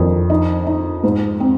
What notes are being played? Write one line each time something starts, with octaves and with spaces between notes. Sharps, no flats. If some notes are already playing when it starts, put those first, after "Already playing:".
Already playing: F2 D#3 A#4
D#4
D#4
G#2
C4